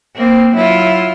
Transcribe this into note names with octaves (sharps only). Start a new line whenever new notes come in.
A#3 C4
F#3 E4 F4